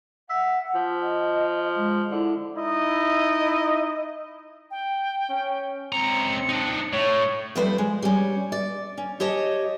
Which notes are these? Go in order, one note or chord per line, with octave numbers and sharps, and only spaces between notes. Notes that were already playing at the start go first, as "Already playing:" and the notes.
E5 F#5
F3
D#5
G#3
D3 E4
D#4 E4 D#5
G5
C#4
C#2 C4 A#5 C#7
D4 D#4
A2 C#5
F3 G3 A3 C4 B4 C5
G#3
G3 C#4
D5
C#4
G4 C#5 D#5 A5